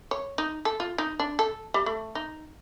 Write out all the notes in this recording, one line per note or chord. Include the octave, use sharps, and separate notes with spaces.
C#5
D#4
A4
F4
D#4
D4
A4
G3
A3
D#4